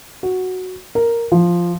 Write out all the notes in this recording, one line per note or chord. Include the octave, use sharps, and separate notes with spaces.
F#4
A#4
F3